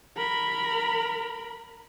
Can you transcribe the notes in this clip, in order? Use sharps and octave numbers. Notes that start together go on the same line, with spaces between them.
A#4 B5